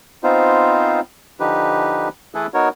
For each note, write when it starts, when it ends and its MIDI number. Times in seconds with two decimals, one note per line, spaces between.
0.24 1.00 59
0.24 1.00 60
0.24 1.00 63
0.24 1.00 65
0.24 1.00 72
1.40 2.08 50
1.40 2.08 53
1.40 2.08 63
1.40 2.08 67
1.40 2.08 71
2.35 2.47 52
2.35 2.47 57
2.35 2.47 64
2.35 2.47 68
2.35 2.47 69
2.35 2.47 71
2.54 2.69 59
2.54 2.69 63
2.54 2.69 66
2.54 2.69 70
2.54 2.69 73